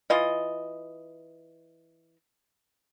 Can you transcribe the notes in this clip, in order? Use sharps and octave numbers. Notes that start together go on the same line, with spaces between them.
E3 F4 D#5